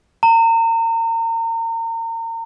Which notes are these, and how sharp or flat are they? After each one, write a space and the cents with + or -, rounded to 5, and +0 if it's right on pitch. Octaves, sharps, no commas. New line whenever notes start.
A#5 -35